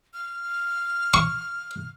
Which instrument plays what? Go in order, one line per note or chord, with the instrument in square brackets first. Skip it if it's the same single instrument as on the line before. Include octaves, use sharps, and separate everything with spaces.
[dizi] F6
[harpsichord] C#6